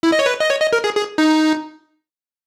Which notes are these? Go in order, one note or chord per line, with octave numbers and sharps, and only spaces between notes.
E4
D#5
C#5
B4
D#5
C#5
D#5
A#4
G#4
G#4
D#4